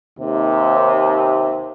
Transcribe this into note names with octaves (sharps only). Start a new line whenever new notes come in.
D#2 C3